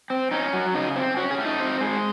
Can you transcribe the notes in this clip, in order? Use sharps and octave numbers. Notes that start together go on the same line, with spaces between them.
C4
C#4 D#4
F#3
C#3 D#4
C4
C#4 F#4
G#4
A3
D#4
C4
G#3